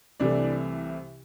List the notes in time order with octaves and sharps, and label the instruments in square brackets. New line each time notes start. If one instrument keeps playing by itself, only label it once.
[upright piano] C2 C3 E3 A3 D4 D5